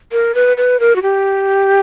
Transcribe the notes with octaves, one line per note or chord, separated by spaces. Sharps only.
A#4
B4
B4
A#4
F#4
G4